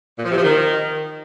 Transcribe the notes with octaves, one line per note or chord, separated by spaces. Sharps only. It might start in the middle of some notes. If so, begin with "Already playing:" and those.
A#2
F3
C3
F3
D#3